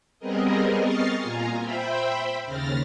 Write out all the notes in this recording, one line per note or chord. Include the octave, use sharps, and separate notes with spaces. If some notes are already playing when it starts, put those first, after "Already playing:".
G3 B3 C4 G#4 A#4 D#5
D#5 C#6 F6 A6 C7
A#2 F4 G#5 A#5
C5 E5 G5 B5
D#2 C#3 F6 A6 A#6